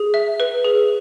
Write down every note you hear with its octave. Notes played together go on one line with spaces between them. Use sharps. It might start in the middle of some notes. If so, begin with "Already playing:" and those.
Already playing: G#4
E5
B4
G#4